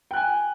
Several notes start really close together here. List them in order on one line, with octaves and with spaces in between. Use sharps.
G5 F#6 G#5